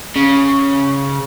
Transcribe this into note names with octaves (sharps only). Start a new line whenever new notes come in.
C#3